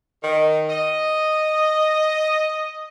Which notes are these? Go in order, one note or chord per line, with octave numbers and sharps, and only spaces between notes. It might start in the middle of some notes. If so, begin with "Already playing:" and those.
D#3
D#5